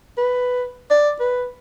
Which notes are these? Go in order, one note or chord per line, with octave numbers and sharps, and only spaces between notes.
B4
D5
B4